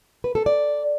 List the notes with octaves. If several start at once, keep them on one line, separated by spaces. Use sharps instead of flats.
B4
A4
D5